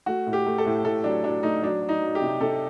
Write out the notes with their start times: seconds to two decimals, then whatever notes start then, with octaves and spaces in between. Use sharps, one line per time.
0.06 A3 F#4
0.27 A2
0.33 G4
0.46 A3
0.58 A4
0.66 A2
0.84 A2 A4
1.04 F#3 D4
1.24 F#3 D4
1.43 A3 D#4
1.62 F#3 D4
1.82 F#3
1.89 D#4
2.02 F#3
2.15 G4
2.22 C3
2.41 C3 A4